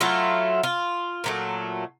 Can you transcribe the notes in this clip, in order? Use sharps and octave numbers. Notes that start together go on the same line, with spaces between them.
F#3 A3 E4 F4
F4
A#2 F#3 A3